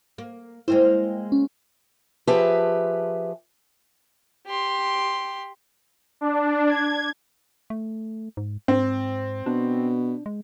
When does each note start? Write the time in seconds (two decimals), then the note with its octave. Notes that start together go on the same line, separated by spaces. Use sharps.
0.18 A#3
0.68 G#3 A#3 E4 C5 G5
1.32 C#4
2.27 F3 G4 G#4 B4 E5
4.46 G4 C6
6.21 D4
6.69 G#6
7.70 A3
8.37 G#2
8.68 G#2 C4
9.46 B2 D4
10.26 G#3